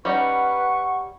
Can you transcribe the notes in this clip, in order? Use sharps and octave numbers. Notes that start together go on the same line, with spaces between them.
G3 C#4 D#4 B4 F#5 C#6